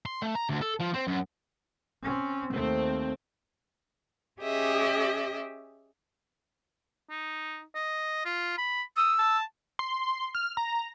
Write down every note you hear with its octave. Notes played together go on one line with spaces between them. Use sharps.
C6
A3
A#5
D2
A4
F3
C4
F#2
C4 C#4
D#2 A3 C4
C#4 G4 G#4 D#5 E5
D#4
D#5
F4
B5
D#6 E6
A5
C6
F6
A#5